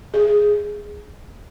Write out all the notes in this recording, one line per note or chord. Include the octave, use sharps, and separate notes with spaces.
G#4